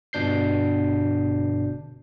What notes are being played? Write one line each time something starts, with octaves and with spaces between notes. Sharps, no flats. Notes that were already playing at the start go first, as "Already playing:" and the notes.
G1 B2 D4 G6 C7